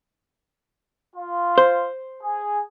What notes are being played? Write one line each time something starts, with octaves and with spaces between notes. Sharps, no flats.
F4
C5
G#4